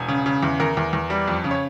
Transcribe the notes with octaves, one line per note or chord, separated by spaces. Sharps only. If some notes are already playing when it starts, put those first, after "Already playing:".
Already playing: E1 G#5
C#3
C#3
E2
E2 A#4
E2
E2
G3
F2
C#3
C#5